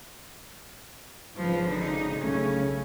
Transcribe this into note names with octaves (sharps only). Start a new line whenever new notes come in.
G#1 C#3 F3 B4
D3 D#4
B1 C#3 A3 C#4